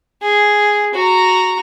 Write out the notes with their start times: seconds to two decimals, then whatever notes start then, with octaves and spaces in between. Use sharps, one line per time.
0.23 G#4
0.94 F#4 A#5